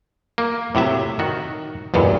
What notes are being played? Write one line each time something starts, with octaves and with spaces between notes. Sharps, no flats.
A#3
A2 C3 F#3 E5
D#3 F#4
B1 E2 G2 A#2